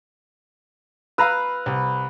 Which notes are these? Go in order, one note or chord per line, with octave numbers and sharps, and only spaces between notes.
B4 F5 A#5 E6
C2